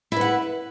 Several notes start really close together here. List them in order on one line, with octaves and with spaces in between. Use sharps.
E4 B4 F#5